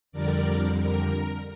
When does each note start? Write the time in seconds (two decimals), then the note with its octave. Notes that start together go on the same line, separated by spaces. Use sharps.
0.12 F2 D3 G3 A#4 D5
0.80 A#4